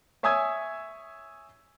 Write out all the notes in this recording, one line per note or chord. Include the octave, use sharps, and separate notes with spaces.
C#5 E5 G#5 D#6 E6 G#6